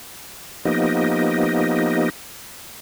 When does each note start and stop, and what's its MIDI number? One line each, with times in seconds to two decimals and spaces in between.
0.65 2.10 53
0.65 2.10 58
0.65 2.10 59
0.65 2.10 63
0.65 2.10 67
0.65 2.10 75